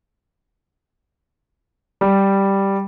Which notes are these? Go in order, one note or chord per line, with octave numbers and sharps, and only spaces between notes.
G3